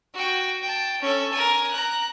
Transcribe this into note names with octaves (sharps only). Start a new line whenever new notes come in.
F#4 G5
G5 A5
C#4 A4
A#4 G#5
A#5 F#6